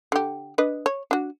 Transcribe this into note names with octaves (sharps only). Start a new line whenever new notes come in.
D3 G4
D4 B4 D#5
C#5
D4 F#4